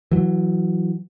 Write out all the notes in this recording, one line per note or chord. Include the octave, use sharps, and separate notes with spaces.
E3 F#3